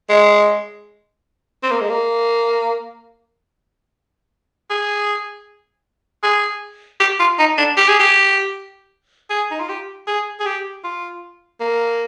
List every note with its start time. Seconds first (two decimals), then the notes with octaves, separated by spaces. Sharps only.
0.10 G#3
1.63 C4
1.72 A#3
1.81 G#3
1.90 A#3
4.70 G#4
6.23 G#4
7.00 G4
7.20 F4
7.39 D#4
7.58 D4
7.77 G4
7.88 G#4
8.00 G4
9.30 G#4
9.51 D#4
9.60 F4
9.69 G4
10.07 G#4
10.40 G#4
10.46 G4
10.84 F4
11.60 A#3